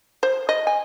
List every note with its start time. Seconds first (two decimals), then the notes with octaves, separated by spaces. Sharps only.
0.23 C5
0.49 D#5
0.67 G#5